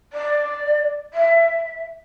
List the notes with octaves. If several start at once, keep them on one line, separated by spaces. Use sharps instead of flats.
D5
E5